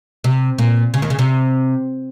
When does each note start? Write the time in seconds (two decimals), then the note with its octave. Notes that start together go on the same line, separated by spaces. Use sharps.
0.24 C3
0.58 A#2
0.94 C#3
1.02 D#2 D#3
1.10 C#3
1.19 C3